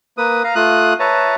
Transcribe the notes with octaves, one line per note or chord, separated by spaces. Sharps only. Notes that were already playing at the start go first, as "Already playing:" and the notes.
A#3 B4 D#6
F5 A#5
A3 F4 D#6 F#6
B4 C#5 E5 A5 A#5